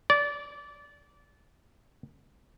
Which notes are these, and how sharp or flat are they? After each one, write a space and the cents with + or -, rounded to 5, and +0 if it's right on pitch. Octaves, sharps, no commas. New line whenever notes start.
D5 -20